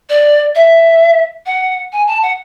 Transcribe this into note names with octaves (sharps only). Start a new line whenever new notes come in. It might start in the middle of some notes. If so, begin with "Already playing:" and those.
D5
E5
F#5
G#5
A5
F#5